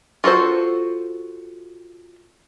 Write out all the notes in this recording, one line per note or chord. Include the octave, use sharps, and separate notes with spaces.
F4 F#4 A4 C5